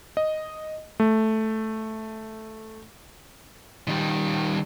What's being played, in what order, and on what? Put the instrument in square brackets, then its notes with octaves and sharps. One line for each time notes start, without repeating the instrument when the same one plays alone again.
[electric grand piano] D#5
A3
[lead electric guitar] D#3 G3